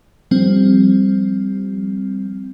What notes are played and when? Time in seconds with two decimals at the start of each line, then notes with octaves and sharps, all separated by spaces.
0.31 F3 G3 C4